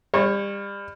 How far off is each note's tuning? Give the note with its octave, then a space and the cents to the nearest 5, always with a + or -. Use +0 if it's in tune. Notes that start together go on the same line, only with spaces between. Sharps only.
G3 +30 C#5 -25